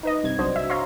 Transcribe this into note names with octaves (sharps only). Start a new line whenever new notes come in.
D#4 B4 D#5
G2 C3 G#6
B1 D4 F#4 C5 D#5
E5
C#5 E5 F5 A#5 C6